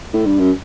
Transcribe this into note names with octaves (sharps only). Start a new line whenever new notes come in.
A2
G2
F#2